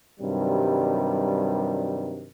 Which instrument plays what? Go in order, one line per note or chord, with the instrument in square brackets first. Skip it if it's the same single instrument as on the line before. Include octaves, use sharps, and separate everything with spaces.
[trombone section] G2 C3 D#3 F#3 G3